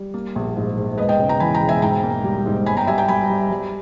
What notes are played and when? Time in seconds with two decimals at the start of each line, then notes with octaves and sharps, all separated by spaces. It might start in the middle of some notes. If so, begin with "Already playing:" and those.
Already playing: G3
0.14 A#3
0.36 A#1
0.56 G#2
0.77 G#2
0.98 E1 B4 D#5
1.09 D#5 G5
1.19 C#3
1.29 G5 A#5
1.40 E3 G#5 B5
1.54 G5 A#5
1.61 E1
1.69 E5 G#5
1.82 G#2 G5 A#5
2.03 A#3
2.24 G3
2.46 G#2
2.66 G1 G#5 B5
2.77 G5 A#5
2.87 G3 E5 G#5
2.98 G5 A#5
3.08 G3 G#5 B5
3.30 G3
3.51 G3